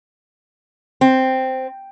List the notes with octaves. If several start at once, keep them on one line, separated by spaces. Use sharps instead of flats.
C4